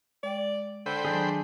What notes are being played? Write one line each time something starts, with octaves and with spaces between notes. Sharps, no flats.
G#3 D5 G5
D3 C5 G5 B5
D#3 F#3 D4 G#4